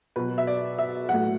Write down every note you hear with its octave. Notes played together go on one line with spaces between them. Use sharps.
B2 F#3 B4
E5
D5
E5
A2 F#3 F#5